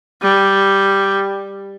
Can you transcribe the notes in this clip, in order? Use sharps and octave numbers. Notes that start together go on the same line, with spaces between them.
G3